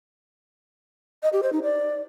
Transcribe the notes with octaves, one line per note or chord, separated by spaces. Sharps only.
D#5
G4
C5
D#4
D5